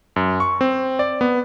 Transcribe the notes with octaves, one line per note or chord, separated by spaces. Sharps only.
F#2
C#6
C4
D5
B3